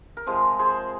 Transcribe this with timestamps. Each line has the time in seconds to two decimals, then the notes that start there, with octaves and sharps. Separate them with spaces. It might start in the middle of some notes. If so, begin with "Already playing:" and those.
0.17 A#4
0.26 C3 F3 G#3 G#4 C5
0.59 G#4 C5